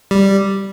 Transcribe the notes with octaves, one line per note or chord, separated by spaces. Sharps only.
G3